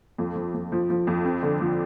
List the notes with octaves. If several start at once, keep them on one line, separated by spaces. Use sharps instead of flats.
F2
F3
F2
F3
F3
F2
C4
D3
F3